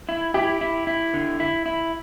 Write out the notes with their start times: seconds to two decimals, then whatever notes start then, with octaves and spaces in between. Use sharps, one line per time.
0.09 E4
0.34 E4 G4
0.61 E4
0.87 E4
1.14 D3
1.40 E4
1.66 E4